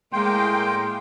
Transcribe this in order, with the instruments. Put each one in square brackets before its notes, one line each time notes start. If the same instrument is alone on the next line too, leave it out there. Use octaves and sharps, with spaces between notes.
[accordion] A2 A#3 G5 [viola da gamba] G#3 [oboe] C6